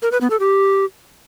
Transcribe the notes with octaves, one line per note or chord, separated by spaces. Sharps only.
A#4
B4
B3
A4
G4